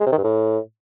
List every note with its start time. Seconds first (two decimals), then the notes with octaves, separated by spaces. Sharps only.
0.01 G#3
0.06 C3
0.12 D#3
0.18 G2
0.24 A2